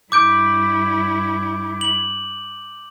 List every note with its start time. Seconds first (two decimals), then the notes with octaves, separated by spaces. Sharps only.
0.12 G2 E4 D6 G6 D7
1.81 F#7